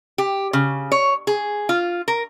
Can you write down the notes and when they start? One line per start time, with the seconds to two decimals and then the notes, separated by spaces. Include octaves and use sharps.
0.18 G4
0.53 C#3
0.92 C#5
1.27 G#4
1.69 F4
2.08 A#4